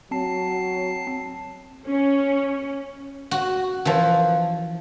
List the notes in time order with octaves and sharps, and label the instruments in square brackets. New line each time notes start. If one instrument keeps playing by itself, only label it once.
[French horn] F#3 [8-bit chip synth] C4 A5 C7
[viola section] C#4
[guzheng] F#4
E3 F3